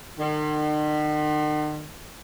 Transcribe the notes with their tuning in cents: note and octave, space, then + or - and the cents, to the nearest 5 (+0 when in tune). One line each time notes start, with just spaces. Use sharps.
D#3 -45